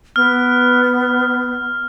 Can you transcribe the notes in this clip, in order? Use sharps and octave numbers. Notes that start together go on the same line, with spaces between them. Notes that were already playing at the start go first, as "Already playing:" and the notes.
B3 F6